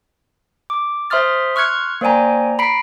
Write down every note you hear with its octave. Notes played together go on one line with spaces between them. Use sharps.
D6
C5 E5 C6 D#6 F6 A6
C6 C#6 F6 F#6 G#6 C#7
A#3 C5 D5 G5 G#5 A#5
A#5 B5 B6 C7 D7